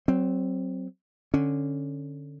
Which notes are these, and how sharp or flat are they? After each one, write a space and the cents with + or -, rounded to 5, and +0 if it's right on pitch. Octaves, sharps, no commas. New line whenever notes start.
F#3 +25 C4 +0
D3 +5 C#4 +0